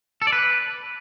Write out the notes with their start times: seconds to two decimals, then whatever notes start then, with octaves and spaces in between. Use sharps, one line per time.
0.22 A4
0.27 D5
0.32 B4